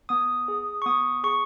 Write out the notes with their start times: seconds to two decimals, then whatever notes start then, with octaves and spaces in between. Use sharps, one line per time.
0.09 B3 D#6
0.48 G#4
0.82 C#6
0.86 B3 D#6
1.23 G#4 C#6